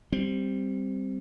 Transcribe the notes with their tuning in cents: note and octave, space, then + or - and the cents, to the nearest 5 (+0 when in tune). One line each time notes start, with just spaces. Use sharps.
G3 +0 C4 +0